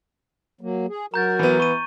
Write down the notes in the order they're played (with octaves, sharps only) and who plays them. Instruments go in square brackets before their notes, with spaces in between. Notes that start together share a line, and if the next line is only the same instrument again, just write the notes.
[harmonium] F#3 A#3
G#4
[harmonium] F#3 F#4 A#4 [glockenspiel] A#5 G6 A6
[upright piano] E3 B3
[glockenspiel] C#6 D#7